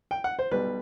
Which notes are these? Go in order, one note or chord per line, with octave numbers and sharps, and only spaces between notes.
G5
F#5
C5
B1 B2 G3 B4